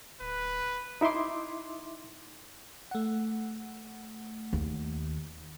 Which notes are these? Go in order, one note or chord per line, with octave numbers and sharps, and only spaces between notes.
D1 B4
D#4 E4 E5 C6 D6
A3 F#5
D#2